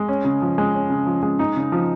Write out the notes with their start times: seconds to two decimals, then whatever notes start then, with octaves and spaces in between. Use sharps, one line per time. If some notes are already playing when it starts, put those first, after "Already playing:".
Already playing: G#3
0.09 C#4
0.25 C#3
0.42 F3
0.58 G#3
0.74 C#4
0.90 C#3
1.07 F3
1.23 G#3
1.39 D#4
1.56 C#3
1.72 F3